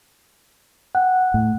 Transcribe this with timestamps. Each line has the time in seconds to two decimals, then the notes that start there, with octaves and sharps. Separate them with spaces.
0.95 F#5 G5 F#6
1.34 A2